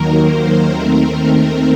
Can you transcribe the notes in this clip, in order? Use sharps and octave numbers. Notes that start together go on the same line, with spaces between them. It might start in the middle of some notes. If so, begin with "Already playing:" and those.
Already playing: D#2 D#3 F#3 A#3 A#4
C5
D#2 D#3 A3 C4 A#4